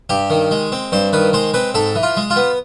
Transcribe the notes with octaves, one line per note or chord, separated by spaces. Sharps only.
G2 G4
D#3
G#3
C4
G2 C5
D#3 B4
G#3 C5
C4 B4
G#2 A4
E3
F4
G#3
F4
B3